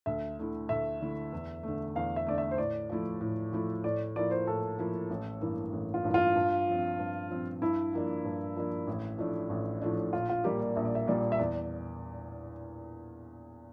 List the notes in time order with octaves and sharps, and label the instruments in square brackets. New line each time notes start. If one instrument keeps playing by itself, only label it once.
[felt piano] D2 [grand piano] E5
[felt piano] D3 A3 E4
[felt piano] D2 [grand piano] E5
[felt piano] D3 A3 E4
E2
D3 A3
[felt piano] E2 [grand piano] F5
[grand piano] E5
[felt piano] D3 A3 [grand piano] D5
[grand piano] E5
C5
[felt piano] A2 [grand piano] D5
[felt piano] F3 A3 E4
A2
F3 A3 E4
[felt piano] A2 [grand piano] D5
[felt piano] F3 A#3 E4 [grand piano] D5
[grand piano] C5
[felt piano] A2 [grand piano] A4
[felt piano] F3 A#3 E4
A1
G2 E3 A#3 E4
A1
[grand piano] F4
[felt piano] G2 E3 A#3 E4
[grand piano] F4
[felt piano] G2
F3 C4
G2
F3 C4
[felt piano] G2 [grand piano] E4
[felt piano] F3 A#3 D4
G2
F3 A#3 D4
A1
A2 F3 A3 D4
A1
A2 F3 A3 D4
[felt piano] A#1 [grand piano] F4
[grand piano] F4
[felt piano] A#2 G3 A#3 [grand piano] G4
[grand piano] D5
[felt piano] A#1 [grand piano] E5
[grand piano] D5
E5
[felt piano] A#2 G3 A#3 [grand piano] D5
[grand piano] E5
[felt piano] E2 [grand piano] D5